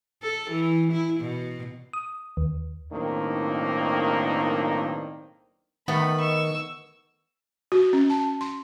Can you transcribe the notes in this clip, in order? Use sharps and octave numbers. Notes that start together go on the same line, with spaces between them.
A4
E3
E4
B2
D#6
D#2
B1 A2 D#3 A#3 C4 D4
D#3 A3 B3 B5
C#6 E6
F#4
C#4
A5
C6